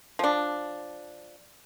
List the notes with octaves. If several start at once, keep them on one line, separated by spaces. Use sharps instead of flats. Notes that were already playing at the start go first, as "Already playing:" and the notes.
F3 D4